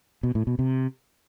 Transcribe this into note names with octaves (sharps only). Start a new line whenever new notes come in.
B2
A2
B2
C3